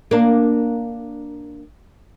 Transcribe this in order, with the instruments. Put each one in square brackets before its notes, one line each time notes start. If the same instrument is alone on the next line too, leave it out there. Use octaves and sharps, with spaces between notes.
[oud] A#3 D4